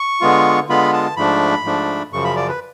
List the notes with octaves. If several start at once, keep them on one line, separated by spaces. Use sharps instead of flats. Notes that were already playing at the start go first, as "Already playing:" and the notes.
Already playing: C#6
D3 G#3 B3 F4
D3 G#3 B3 F4 B5
A5
G#2 F3 A3 D4 B5
G#2 F3 A3 D4
F#2 C#3 F3 C#6
B5
D5
B4